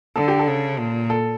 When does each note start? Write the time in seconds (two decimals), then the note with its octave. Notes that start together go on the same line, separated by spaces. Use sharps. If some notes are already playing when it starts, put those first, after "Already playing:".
0.16 D3 A4
0.28 G4
0.39 A4
0.47 C#3
0.79 A#2
1.10 A4